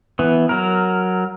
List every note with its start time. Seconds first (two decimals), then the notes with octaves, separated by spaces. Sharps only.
0.19 E3 B3
0.49 F#3 A#4